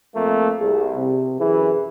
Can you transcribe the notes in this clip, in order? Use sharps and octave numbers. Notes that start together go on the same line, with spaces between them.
F2 A3 A#3
C2 G#4
C3
F#2 E3 E4 G#4